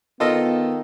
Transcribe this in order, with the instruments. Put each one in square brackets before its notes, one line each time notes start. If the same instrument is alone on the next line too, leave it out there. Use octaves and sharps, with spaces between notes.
[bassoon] D#3 [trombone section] B3 [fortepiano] F4 A4 D#5